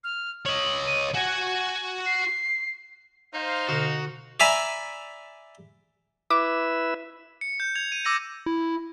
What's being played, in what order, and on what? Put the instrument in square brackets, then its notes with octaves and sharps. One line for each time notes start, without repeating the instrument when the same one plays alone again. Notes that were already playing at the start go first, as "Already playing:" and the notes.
[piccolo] F6
[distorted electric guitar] C#5 D#5 [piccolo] F#7
[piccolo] D#7
[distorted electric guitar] F#4 F#5 [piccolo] G#5
[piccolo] C7
[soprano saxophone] D#4 [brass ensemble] C5 F5
[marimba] B2 D3 [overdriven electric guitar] F#4
[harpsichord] D5 E5 G#5 A#5 B5
[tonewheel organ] E4 B4 E5 [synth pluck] D6
[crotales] C#7
G6
G#6 F7
D#7
D6 E6 A#6 D#7
[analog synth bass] E4